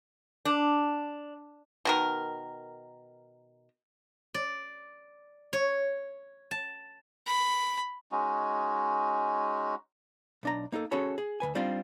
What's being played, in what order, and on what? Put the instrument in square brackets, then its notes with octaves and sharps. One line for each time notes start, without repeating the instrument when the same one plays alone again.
[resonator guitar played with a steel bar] D4
[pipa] B2 D#3 A#4
[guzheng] D5
C#5
A5
[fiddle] B5
[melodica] G#3 C#4 D#4 F#4
[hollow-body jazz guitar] B1 D4 A#5
A#3 D#4 G4 A4
C#4 F#4 G#4 A4 C#5 B5
G#4
D2 C#3 B4 G#5
G3 C4 D4 D#4 F4